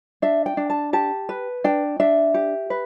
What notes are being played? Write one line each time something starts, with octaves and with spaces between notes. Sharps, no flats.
D4 E5
G5
D4
A5
G4 A5
B4
D4 G5
D4 E5
G4
B4